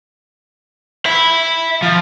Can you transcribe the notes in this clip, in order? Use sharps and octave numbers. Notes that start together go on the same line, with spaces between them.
E5 B5
F3